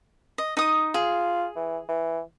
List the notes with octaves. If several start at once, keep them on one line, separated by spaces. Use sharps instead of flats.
D#5
D#4 D#6
F4 G#4
E3
E3